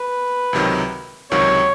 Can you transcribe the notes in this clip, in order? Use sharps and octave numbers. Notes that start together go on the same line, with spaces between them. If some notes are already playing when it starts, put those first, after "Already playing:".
Already playing: B4
C#2 C3 D#3 F#3
C#2 C3 D#3 F#3 C#5